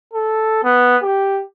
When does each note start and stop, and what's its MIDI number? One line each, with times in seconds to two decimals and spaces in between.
0.14 0.61 69
0.64 0.97 59
1.03 1.42 67